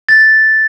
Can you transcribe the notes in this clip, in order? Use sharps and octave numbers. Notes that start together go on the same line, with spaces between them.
A6